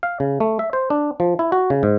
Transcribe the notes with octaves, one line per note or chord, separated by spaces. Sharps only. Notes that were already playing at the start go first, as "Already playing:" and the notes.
F5
C#3
A3
E5
C5
D4
F3
E4
F#4
C#3
G#2